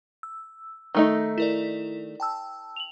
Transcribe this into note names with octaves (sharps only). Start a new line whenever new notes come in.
E6
D#3 A3 D#4
E4 A#4 D5
G5 A5 E6
F7 F#7